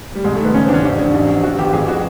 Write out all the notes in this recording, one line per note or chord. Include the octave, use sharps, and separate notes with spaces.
G3
C2 G#3
A3
D#3
B3
C#3 C#4
C4
E2 C#4 D4
A1 D4
F3
A1
A1
C3 F#4
G1 G4
F2 G#4
F#4